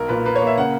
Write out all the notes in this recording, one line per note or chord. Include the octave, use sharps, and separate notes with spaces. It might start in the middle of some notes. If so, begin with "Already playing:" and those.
Already playing: B1 A#4
A#2 B4
A#3 B4
C#5
A#3
E5
C#3 F#5